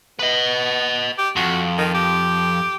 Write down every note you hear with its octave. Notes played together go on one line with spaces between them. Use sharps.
B3 B4 D#5
G4
F2 F#4
D#3
G4